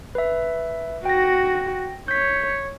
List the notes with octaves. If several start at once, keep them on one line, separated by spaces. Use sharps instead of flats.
B4 E5
F#4 G5 A#6
C#5 G6 B6